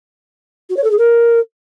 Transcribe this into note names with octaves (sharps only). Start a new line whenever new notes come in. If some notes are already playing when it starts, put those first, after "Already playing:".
F#4
C#5
A4
G#4
A#4